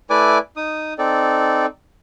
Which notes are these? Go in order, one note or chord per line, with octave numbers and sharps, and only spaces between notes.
A3 E4 B4 D5 G#5 D6
D#4 D#6
C4 D#4 A4 D5